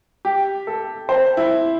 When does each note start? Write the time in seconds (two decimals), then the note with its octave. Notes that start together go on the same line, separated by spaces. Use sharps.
0.25 G4
0.67 A4
1.09 C5
1.37 E4